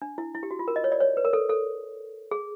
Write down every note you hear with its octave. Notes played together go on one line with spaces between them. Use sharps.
D4
E4
E4
G4
F#4
F4
A#4
D#5
C#5
D5
C#5
B4
A#4
A4
A4
G#4